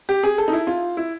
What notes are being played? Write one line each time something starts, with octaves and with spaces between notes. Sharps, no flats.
G4
G#4
A4
D#4
E4
F4
E4